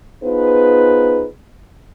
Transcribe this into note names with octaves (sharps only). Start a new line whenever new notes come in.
B3 D#4 F4 G#4 B4 C5